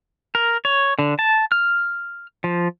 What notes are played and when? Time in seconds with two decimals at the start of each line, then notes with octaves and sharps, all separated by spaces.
0.35 A#4
0.65 C#5
0.99 D3
1.19 A5
1.52 F6
2.44 F3